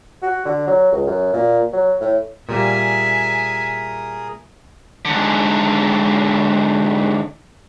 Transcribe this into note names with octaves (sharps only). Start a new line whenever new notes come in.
F#4
D3
F#3
C#2
F#2
A#2
F#3
A2
A#2 G3 A#3 G#4 A#4 E5 G#5 D#6
G#2 D3